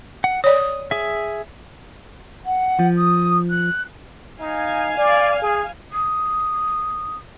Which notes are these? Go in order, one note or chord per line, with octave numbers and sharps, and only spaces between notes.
F#5
C#5 D5 D#6
G#4 E5
F#5
F3
D#6
F#6
D#4 F5 G#5
D5
G#4
D#6